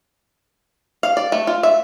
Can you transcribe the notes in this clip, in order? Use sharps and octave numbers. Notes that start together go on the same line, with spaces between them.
F5
D5
A3
F4
E5